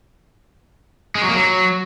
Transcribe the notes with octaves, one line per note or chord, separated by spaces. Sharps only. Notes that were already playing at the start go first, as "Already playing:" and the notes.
G#3
F#3
A#3
F#3